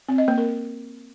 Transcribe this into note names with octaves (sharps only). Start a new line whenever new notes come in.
C4
D#5
A#3
A#4